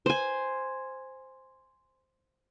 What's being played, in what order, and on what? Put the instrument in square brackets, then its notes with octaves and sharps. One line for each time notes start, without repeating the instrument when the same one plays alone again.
[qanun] C5 G#5